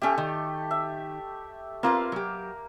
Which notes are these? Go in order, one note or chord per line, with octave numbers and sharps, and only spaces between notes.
A3 C#4 G4 E5
D#3
E5
A#3 C4 F4 B4
F#3 G4